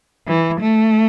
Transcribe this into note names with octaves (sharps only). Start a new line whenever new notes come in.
E3
A3